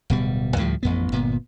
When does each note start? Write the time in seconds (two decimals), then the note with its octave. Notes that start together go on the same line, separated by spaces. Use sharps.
0.10 D1 B2 G3
0.57 D2 A2 F3 G3
0.83 A1 F2 B3
1.12 G1 A#2 B3